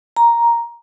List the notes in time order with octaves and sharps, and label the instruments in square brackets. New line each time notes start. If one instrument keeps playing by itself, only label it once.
[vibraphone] A#5